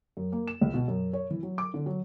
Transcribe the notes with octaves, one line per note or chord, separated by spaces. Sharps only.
F#2
A#3
E7
C#2
B2
F#2
C#5
E3
F#3
D6
D3
F#3